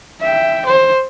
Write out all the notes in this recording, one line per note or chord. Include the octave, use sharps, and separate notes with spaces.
E5 G5
C5